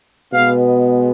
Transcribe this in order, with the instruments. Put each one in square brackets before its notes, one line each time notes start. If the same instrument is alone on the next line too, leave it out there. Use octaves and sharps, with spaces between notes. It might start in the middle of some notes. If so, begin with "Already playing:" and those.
[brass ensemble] B2 G#3 B3 F5